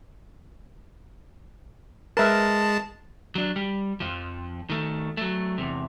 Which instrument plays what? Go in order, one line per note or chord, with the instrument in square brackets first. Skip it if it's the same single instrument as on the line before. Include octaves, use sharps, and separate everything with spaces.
[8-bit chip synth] G#3 A5 [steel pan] A#4 B4 E5
[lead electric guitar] F#3 D4
G3
F2 F3
D#3 A3
F#3 A3
E2 C3